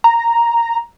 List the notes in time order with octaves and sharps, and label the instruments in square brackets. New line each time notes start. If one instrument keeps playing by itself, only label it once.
[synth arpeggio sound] A#5